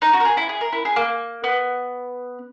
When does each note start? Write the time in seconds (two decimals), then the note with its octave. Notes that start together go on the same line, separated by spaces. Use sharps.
0.02 D#4
0.13 F#4
0.20 A#4
0.25 G#4
0.37 E4
0.49 G#4
0.61 A#4
0.73 E4
0.85 G#4
0.96 A#3
1.44 B3